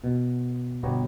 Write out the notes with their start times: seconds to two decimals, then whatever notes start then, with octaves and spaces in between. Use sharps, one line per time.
0.04 B2
0.83 G1 B2 B3 G4 C#5 A#5